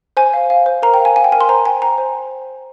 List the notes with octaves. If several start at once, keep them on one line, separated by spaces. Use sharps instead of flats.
C5 G#5
F5
F5
C5
A#4 A#5
G5
F5
G#5
F5 G#5
G5
A#4 G#5
C6
C5 A#5
G5 G#5
G5 A#5
C5